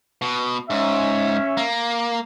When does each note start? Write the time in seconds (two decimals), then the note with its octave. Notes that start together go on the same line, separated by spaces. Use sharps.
0.22 B2
0.70 G#2 C#4 E5
1.57 A#3